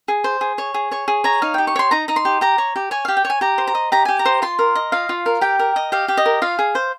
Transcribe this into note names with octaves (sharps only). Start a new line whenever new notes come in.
G#4
C5
G#4
C#5
G#4
C#5 C#6
G#4
C#5 A#5
D#4 F5
G4 G5
C#6
C#5 C6
D#4 A#5
D#4 A#5
C6
G4
G4 A#5
C#5
G4
C#5 G#5
G4 F5
G5
C#5
G#5
G4 A#5
C5
A#5
D#5
G4 A#5
G4 G#5
A#5
C5
F4 C6
A#4
D#5
F4 F5
F4
A#4
G4 G5
A#4
D#5
G4 F5
G4
D#5
A#4
F4 F5
G#4
C5